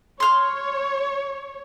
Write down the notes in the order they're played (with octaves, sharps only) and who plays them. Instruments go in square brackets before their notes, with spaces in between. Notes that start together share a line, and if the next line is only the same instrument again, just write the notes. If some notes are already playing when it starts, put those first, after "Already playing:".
[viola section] C#5 [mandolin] C6 F6